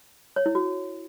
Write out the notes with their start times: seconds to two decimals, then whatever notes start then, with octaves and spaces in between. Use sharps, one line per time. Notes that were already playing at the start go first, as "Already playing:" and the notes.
0.36 C#5
0.46 E4
0.55 F#4